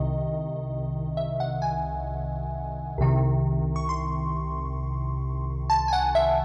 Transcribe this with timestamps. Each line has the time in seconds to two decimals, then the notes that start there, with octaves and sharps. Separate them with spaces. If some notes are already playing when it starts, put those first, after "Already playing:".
Already playing: C2 C3 D#3 D#5
1.17 E5
1.40 F#5
1.62 G#5
2.98 C2 C3 D#3
3.76 C#6
3.89 C6
5.70 A5
5.88 G#5
5.93 F#5
6.15 E5